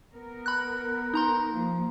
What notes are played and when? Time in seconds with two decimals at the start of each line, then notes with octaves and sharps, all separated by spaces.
0.13 B3 A#4
0.46 B5 F#6
1.14 D#4 A#5 C6
1.53 F3 A#3